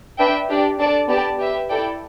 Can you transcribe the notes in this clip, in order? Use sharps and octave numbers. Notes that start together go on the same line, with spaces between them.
D4 B4 E5 G5
D4 G4 D5
D4 A4 D5 A5
B3 G4 D5 A5
G4 B4 E5
E4 A4 D5 G5